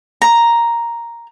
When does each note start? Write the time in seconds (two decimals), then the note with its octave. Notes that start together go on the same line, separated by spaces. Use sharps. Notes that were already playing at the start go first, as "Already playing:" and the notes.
0.22 A#5